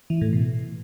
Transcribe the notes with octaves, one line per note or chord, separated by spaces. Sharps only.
E3
A2
B2